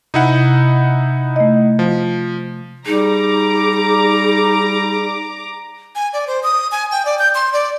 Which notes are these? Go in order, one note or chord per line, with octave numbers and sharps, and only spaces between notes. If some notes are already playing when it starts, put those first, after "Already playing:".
C3 D#4 E4 F#5
A3 D#5
F3
G3 D#4 G#4 A#5 D6
G#5
D5
C5
D#6
G#5
G5
D5
G6
C6
D5